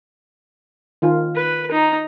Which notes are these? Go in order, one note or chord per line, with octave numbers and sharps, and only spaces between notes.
D#3 F4
B4
D#4 A#5